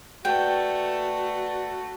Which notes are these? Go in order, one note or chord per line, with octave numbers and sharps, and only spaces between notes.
A3 F#4 B4 D5 G5